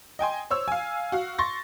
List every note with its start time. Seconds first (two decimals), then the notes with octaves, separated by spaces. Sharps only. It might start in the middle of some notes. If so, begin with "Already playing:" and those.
0.19 D#5 G5 G#5 C6
0.51 C5 C#5 E6
0.68 F5 G#5
1.12 F#4 F5
1.38 C6 C#6 A6 A#6